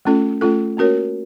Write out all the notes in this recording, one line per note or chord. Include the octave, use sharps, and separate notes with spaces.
A3 C#4 F4 A4
A3 C#4 F4 A4
A#3 C#4 F#4 A#4 C#5